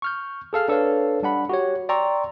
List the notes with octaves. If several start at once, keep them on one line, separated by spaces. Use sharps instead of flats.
C#6 F6 G6
G#4 A4 F5 F6
D4 A4 B4 C#5 F5
G3 D4 F#5 B5
F#4 G4 C#5
D5 G5 A#5 C6 C#6 E6